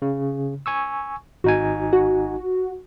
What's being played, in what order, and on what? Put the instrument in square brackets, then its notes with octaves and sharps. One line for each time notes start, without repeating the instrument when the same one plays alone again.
[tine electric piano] C#3
G#5 C#6 E6
[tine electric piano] G#1 D#4 G#5 [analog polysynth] F#4
[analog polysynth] F#4